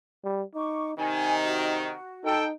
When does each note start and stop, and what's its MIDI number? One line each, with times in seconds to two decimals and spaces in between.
0.24 0.43 55
0.55 0.93 63
0.55 0.90 85
0.55 0.90 86
0.97 1.90 48
0.97 1.90 51
0.97 1.99 63
0.97 1.33 80
1.44 2.31 66
2.24 2.53 63
2.24 2.44 69
2.24 2.44 79